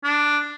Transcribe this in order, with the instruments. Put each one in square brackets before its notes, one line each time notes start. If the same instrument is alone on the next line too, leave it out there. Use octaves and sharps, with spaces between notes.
[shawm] D4